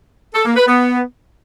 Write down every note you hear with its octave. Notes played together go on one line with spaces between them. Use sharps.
A4
A#3
B4
B3